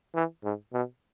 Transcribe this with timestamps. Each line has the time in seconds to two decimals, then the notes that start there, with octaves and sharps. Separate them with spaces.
0.15 E3
0.44 G#2
0.73 B2